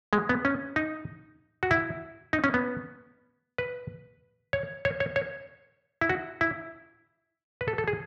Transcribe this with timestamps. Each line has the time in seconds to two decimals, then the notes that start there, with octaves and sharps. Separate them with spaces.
0.13 G#3
0.29 B3
0.45 C#4
0.76 D#4
1.63 F#4
1.71 E4
2.33 D#4
2.44 C#4
2.54 B3
3.58 B4
4.53 C#5
4.85 C#5
5.00 C#5
5.16 C#5
6.01 E4
6.09 F#4
6.41 E4
7.61 B4
7.68 A4
7.78 A4
7.88 G#4